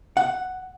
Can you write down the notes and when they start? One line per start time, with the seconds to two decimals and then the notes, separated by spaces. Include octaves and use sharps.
0.17 F#5